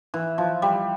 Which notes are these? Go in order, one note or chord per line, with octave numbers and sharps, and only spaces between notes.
E3
F3
G3